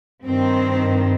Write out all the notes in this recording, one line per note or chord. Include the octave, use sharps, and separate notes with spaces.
G2 D#3 C4